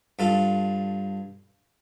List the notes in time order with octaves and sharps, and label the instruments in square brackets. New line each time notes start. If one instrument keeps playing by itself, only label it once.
[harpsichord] G2 F4 A4